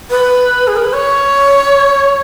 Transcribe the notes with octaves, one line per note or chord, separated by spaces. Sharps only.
B4
G#4
A#4
B4
C#5